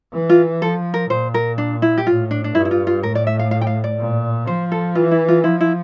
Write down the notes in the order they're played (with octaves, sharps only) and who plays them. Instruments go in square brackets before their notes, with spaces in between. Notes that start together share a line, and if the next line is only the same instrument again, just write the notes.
[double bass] E3
[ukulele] F4
[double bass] F3 [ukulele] A4
[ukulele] A#4
[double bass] A#2 [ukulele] C5
[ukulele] A#4
D4
E4
G4
[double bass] A2 [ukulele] F4
[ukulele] D4
D4
[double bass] G2 [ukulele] E4
[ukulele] E4
F4
F4
[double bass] A2 [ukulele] A#4
[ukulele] D5
E5
F5
F5
G5
F5
D5
[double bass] A#2
[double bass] F3 [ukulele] C5
[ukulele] A4
[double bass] E3 [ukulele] F4
[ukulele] E4
F4
[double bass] F3 [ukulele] E4
[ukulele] E4